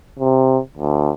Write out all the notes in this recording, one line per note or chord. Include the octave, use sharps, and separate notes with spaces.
C3
D2